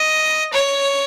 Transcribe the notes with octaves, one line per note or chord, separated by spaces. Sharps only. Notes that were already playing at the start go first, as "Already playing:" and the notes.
Already playing: D#5
C#5